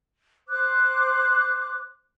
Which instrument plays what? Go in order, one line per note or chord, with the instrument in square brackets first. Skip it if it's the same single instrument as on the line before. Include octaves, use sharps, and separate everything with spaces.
[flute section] C5 D6 F#6